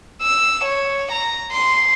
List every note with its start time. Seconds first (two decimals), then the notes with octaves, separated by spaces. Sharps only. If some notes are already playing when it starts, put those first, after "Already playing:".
0.22 E6
0.64 C#5
1.12 A#5
1.52 C6